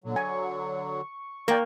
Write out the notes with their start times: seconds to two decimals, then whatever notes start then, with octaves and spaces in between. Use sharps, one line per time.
0.04 A#2 D3 F#3
0.16 G#5 C#6
1.48 A#3 A#4 D5 G5